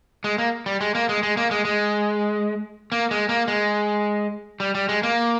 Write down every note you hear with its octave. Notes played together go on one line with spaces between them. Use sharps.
G#3
A#3
G3
G#3
A#3
G#3
G#3
A#3
G#3
G#3
A#3
G#3
A#3
G#3
G3
G3
G#3
A#3